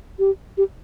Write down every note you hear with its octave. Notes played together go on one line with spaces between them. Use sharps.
G4
G4